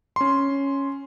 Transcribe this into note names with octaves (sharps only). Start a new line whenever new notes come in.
C#4 C6